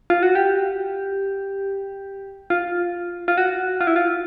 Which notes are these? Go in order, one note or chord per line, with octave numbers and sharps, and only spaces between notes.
F4
F#4
G4
F4
F4
F#4
F4
E4
F4